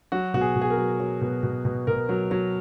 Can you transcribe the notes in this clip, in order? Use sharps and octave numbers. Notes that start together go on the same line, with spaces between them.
F#3 F#4
B2 F#4
G#4
B2
G#4
A#4
F#3
F#3
B2
B2
B2
B2 A#4
F#3
F#3